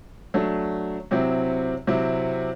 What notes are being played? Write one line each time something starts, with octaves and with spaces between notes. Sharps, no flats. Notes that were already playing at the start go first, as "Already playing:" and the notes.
F#3 A3 D4
C3 F#3 C4 E4
C3 F#3 C4 E4